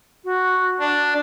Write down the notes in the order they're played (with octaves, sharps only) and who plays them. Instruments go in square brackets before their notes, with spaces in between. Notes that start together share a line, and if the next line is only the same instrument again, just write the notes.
[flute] F#4
[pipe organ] D4 [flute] A5